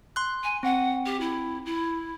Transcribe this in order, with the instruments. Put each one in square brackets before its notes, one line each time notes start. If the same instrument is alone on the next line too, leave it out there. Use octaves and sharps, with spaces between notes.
[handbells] C6 F#6
[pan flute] G#5
[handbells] C4 [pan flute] F#5
[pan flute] G4
E4
E4